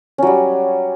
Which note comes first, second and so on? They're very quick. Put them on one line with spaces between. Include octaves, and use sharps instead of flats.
C#4 F#3 G3